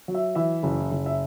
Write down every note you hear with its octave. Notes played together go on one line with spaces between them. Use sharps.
F#3
E5
E3 E5
F#1
F#1
E5